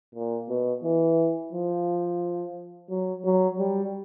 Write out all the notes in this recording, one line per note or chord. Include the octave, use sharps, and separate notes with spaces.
A#2
B2
E3
F3
F#3
F#3
G3